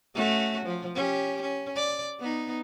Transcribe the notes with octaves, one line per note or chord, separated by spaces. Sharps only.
A3 C#4 F#4
F3
C#4 G4
C#4
D5
B3 D#4